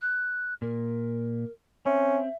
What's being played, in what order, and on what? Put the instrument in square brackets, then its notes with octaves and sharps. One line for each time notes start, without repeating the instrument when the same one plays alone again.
[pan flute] F#6
[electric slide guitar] A#2 [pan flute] A#4
[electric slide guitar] C4 [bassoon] C#4 [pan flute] E5